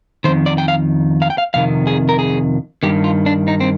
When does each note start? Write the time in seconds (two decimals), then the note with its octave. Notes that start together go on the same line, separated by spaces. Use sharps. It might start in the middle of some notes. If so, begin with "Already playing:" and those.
0.24 F2 D#3 C5
0.46 D5
0.58 G5
0.68 F5
1.22 F5
1.30 G5
1.38 F5
1.54 F2 C3 D#3 F5
1.87 G#4
2.09 A#4
2.19 G#4
2.83 G2 D#3 G4
3.04 F4
3.26 D4
3.48 D#4
3.60 C4